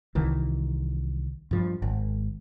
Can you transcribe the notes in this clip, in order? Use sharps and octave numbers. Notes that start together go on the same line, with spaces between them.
C2 D#3 E3
G2 F3
G#1